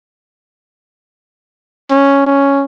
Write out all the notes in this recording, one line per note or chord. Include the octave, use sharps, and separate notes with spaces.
C#4
C#4